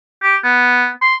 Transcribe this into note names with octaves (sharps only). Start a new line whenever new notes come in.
G4
B3
C6